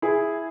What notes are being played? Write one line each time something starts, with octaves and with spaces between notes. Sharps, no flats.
E4 G#4